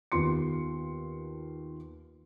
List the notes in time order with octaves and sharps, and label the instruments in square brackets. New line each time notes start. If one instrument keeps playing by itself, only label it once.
[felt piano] D#2 B3 F4 C6 C#7